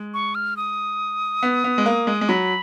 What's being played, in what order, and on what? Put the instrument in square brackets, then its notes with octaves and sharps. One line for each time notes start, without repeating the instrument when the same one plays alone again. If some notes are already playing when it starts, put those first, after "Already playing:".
Already playing: [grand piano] G#3
[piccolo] C#6
F6
D#6
[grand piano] B3
B3
G#3
A#3
G#3
G#3
[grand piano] F#3 [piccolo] B5